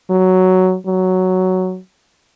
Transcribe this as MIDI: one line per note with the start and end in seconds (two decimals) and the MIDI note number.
0.10 0.76 54
0.87 1.79 54